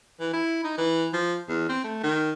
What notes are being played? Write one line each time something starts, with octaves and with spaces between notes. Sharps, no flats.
E3
E4
D#4
E3
F3
E2
C4
A3
D#3